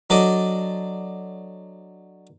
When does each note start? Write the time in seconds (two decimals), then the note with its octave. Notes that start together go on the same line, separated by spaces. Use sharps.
0.10 F#3 D4 A4 D5 D#5